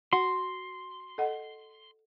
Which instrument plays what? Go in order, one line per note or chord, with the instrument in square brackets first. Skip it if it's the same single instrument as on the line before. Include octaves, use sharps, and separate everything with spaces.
[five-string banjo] F#4 [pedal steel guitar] C6
[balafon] A4 D#5 F#5